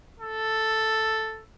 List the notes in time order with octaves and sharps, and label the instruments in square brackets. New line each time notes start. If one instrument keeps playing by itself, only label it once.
[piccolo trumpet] A4